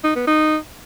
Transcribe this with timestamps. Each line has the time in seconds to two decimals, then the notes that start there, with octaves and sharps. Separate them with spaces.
0.04 D#4
0.16 B3
0.27 D#4